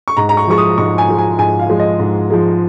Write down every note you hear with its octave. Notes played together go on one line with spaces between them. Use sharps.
C#6
G#2 A#5
A#5
C#6
F3 G#3 C#6
D#6
G#2 C#6
G#5
F3 G#3
G#5
G#2 G#5
F5
F3 G#3
D#5
G#2
F3 G#3